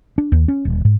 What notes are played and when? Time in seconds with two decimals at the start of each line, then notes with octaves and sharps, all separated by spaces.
0.18 D4
0.32 D#2
0.48 C#4
0.65 D#1
0.85 G#2